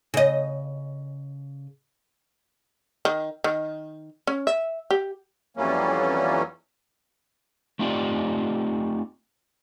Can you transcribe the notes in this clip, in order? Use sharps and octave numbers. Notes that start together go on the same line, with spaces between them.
C#3 D#5
D#3
D#3
C#4
E5
G4
F2 E3 F#3 G3 A#3 C#4
A3 C4 D#4 F4 G4 D5